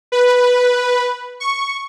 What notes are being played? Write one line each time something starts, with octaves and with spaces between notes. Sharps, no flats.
B4
C#6